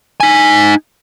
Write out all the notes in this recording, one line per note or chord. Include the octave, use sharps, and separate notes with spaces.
D#4 G#5